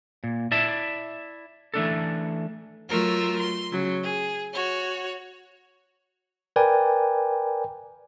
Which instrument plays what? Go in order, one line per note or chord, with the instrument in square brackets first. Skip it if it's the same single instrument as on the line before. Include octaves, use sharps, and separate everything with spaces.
[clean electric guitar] A#2
E4 D5 E5 A5
E3 A3 D4 A4
[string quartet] F#3 A3 F4 A#4 E6
C6
C#3 F#3
G#4
F#4 C#5
[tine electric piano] A#4 B4 D5 G5 G#5